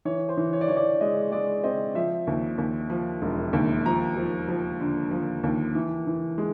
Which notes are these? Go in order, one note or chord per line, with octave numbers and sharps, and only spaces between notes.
E3 C#5
C5
E3
C#5
D5
E3 C#5
D5
G#3 D#5
G#3 D5
C4 D#5
F3 E5
D#2
D#2
F3
E1
D#2
F3 A#5
F3
F3
D3
F3
D#2
E3
E3
G#3